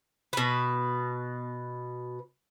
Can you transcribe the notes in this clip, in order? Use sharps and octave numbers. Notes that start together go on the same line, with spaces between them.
B2 B4